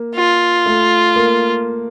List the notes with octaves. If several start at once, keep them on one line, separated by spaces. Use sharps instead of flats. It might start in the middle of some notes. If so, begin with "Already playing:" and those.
Already playing: A#3
F4
A3
A#3